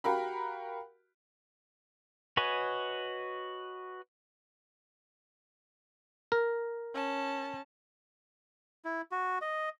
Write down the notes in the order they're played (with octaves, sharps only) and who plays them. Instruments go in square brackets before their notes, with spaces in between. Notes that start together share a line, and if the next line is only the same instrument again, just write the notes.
[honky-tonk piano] F#4 G4 A#4 F5 B5
[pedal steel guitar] F#4 B4 C#5 D#5 G#5
[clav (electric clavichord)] A#4
[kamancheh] C#4 A5
[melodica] E4
F#4
D#5